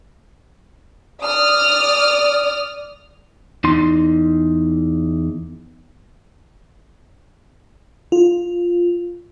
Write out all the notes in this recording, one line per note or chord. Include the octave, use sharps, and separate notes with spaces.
D5 D#6 F6
E2 D#4 C6
F4